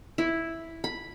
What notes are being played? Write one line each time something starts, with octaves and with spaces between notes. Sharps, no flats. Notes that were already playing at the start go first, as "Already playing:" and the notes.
E4
B5